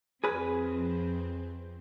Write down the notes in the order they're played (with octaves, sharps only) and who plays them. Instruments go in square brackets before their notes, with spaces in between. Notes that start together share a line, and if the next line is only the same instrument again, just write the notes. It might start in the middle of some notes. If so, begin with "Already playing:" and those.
[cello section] F2 C4 [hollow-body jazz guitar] G#4 B4